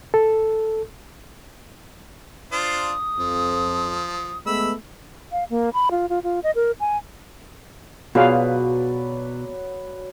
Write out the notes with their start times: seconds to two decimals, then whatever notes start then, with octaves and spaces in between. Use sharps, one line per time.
0.14 A4
2.52 D4 F4 C5 D#6
3.18 F2 F3
4.47 G#3 A3 B3 B5 E6
5.32 F5
5.50 A#3
5.74 B5
5.91 F4
6.09 F4
6.23 F4
6.44 D#5
6.55 A#4
6.80 G#5
8.15 B2 F#3 F4 G#4 B4 D5 F5